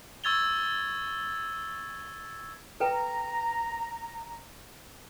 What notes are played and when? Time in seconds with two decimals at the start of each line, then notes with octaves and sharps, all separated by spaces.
0.24 C#6 E6 G#6 A6 F7 G7
2.80 A4 B4 G5 A#5